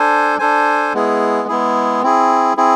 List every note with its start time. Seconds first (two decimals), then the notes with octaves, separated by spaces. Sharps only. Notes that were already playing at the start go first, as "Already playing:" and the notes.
Already playing: D4 A4 C5 G#5
0.39 D4 A4 C5 G#5
0.94 G#3 B3 E4 G#4
1.48 G#3 B3 E4 G#4
2.03 C4 E4 G#4
2.57 C4 E4 G#4